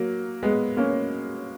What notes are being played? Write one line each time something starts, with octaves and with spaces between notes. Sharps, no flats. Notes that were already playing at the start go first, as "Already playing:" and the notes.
Already playing: F#3 A#3
G#3 B3
A#3 C#4